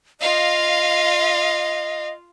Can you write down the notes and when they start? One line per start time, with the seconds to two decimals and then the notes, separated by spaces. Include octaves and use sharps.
0.21 F4 D#5 F5